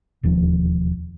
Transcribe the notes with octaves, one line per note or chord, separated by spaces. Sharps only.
E1 D#2 F3